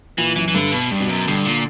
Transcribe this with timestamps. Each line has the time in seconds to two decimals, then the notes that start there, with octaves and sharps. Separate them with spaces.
0.18 A#2 E3
0.36 F#2 E3
0.48 E3
0.54 G2 D3
0.72 B2
0.91 G2
1.00 B2
1.09 F#2
1.27 G2 D3
1.45 A#2